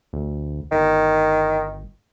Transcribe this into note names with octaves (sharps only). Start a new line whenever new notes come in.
D2
G1 D#3